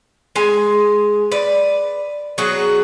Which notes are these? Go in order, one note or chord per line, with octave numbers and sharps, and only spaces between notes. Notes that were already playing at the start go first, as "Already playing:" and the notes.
G#3 G#5
B4 D5
F#3 B3 F#4 G#4